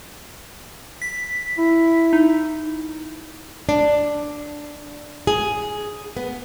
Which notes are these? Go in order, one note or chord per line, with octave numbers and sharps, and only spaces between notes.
B6
E4
D#4
D4
G#4
B3